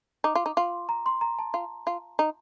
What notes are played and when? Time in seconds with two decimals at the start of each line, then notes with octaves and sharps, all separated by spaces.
0.24 D#4 D6
0.35 F4
0.46 D#4
0.57 F4 C6
0.89 A#5
1.06 C6
1.21 A#5
1.39 A5
1.54 F4
1.87 F4
2.19 D#4